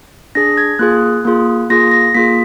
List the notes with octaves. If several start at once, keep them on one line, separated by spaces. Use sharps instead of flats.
D4 G#4 A#6
G#6
A#3 F4 G#4 F#6
A#3 F4 G#4
A#3 F4 G#4 A#6
A#6
A#3 F4 G#4 B6